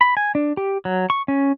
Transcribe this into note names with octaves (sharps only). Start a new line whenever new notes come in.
B5
G#5
D4
G4
F#3
C#6
C#4